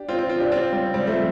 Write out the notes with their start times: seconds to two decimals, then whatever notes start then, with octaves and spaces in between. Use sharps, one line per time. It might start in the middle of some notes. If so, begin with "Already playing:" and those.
Already playing: D4 G4
0.09 C4 F4
0.19 C4 F4
0.29 C4 F4
0.40 D4 G4
0.52 C4 F4
0.72 G3 C4
0.94 G3 C4
1.07 F3 A3